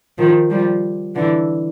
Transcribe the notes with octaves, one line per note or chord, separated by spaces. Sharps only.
D#3 F3
F3 G3
D3 E3